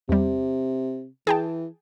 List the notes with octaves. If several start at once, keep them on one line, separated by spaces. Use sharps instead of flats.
E2 C3 G3
E3 G#4 G5 A5